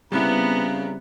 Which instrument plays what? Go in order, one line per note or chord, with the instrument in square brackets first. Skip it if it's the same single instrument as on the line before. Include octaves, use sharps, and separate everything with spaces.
[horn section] C#3 A#5 [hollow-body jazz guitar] G3 C4 E4 [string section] B3